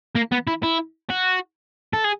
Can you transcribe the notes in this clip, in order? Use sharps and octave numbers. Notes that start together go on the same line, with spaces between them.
A#3
B3
E4
E4
F#4
A4
G#4